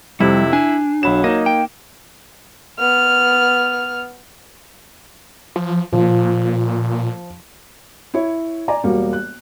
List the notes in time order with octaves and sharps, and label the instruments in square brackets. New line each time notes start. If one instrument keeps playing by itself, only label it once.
[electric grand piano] F2 C3 [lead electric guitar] G3 [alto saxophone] E4
[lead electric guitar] D4 [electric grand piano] G#5
[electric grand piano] B1 B5 E7 [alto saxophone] F#3
[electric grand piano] A#3 D#4 [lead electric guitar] D#5
[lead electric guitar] G5
[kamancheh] B3 F6
[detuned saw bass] F3
[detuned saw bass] A#2 [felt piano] F3
[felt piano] E4 C#5
D5 G#5 A#5
E1 G3 A#3 F#4
F#6